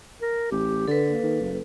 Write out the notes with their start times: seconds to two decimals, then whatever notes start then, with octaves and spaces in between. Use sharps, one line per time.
0.21 A#4
0.51 A1 G4
0.88 D3 A4 B4
1.08 A#3
1.23 D#3
1.41 F#1